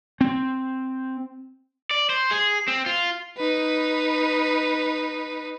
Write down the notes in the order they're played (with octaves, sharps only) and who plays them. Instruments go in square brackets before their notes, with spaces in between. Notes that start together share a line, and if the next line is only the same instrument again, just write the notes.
[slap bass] C4
[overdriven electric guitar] D5
C5
G#4
C4
F4
[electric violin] D#4 B4